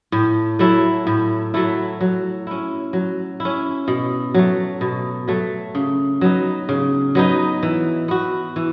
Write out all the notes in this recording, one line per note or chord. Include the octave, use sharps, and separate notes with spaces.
A2
F#3 A3 E4
A2
F#3 A3 E4
F#3
C#4 E4
F#3
E4
C#4
B2
F#3 A3
B2
F#3 A3
C#3
F#3 B3 D#4
C#3
F#3 B3 D#4
E3
B3 F#4
E3